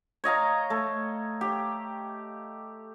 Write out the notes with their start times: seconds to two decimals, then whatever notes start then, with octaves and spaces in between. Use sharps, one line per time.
0.24 C#5 D#5 F5 A#5
0.70 A3
1.41 G4